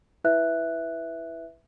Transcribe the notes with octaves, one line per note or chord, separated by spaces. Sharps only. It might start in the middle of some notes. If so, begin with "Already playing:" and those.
E4 B4 E5 F#6